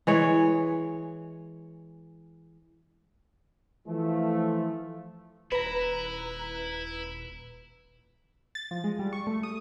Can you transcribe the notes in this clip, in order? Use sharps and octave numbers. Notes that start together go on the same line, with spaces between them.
E3 G#3 C#5
E3 F3 A3
D#1 E4 B4 A#5
A6
F3
G#3
G3
C#6
A3
D#6